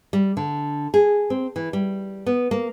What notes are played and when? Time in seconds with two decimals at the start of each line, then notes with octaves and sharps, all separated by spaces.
0.13 G3
0.37 D3
0.94 G#4
1.30 C4
1.56 E3
1.73 G3
2.26 B3
2.51 A#3